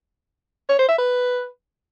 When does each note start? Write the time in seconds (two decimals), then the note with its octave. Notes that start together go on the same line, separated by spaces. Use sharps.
0.69 C#5
0.79 C5
0.89 E5
0.99 B4